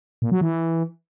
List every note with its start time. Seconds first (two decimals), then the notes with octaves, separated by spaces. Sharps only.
0.22 A#2
0.32 F#3
0.41 E3